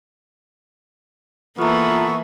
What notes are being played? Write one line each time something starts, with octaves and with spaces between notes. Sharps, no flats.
E3 A#3 B3 F4 A4 E5 A#5 C#6